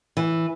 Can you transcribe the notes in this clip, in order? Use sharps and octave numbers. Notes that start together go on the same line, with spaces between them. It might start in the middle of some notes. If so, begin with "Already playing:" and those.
E3